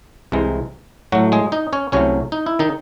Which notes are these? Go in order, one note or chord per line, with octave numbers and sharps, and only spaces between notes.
C2 C3 E3 G#3
A2 F#3 A3 F#4
G#3 G#4
D#4 D#5
C#4 C#5
C2 C3 F#3 A3 C#4 C#5
D#4
E4
D#3 D#4